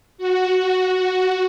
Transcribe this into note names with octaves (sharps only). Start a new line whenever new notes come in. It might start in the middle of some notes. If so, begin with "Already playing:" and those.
F#4